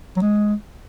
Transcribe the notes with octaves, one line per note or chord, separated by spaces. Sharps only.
F#3
G#3